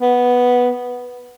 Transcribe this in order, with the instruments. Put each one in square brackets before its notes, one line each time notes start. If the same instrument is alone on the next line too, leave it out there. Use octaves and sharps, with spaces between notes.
[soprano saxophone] B3